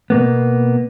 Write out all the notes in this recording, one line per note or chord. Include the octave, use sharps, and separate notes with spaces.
B2 A#3 B3